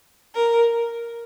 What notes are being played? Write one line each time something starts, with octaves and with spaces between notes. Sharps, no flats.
A#4